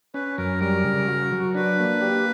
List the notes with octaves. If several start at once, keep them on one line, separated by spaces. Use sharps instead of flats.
C#4 B4
F#2 A#4
G3 A#4
C#3
F#4
F#3
D4 B4
A#3
G4